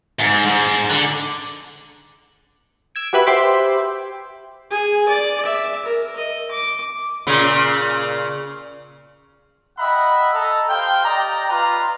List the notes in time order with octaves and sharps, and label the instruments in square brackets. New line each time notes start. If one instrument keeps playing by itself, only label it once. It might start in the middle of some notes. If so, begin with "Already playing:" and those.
[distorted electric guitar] G#2
G#2
D3
[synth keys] E6 G#6 D7
F#4 G4 B4 E5 B5
G4 C5 E5 G5 C6 D6
[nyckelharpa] G#4
D5
E5
A#4
D#5
D6
[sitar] A#2 C#3
[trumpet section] D#5 E5 F#5 G5 A#5 B5
A4 D#5 A#5
G4 C5 F5 G5
G4 D5 D#5 G5 A#5
F4 B4 A#5